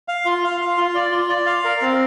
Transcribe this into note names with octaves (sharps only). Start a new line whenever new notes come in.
F5
F4
F5
F5
F4
D5
F4
D5
F5
A#4
C4